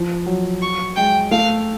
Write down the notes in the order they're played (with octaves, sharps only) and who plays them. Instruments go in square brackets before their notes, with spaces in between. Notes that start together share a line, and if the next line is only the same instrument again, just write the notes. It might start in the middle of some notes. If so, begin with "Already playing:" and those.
Already playing: [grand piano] F3
F#3
[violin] C#6
[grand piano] G#3 [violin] G5
[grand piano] A3 [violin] F5